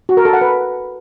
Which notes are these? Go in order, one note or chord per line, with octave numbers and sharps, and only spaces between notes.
F#4
A#4
A4
F#5
B4